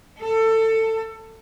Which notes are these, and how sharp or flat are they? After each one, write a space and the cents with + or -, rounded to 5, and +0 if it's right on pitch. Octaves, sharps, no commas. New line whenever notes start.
A4 +20